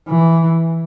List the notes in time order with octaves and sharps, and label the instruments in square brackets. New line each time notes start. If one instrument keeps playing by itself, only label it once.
[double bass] E3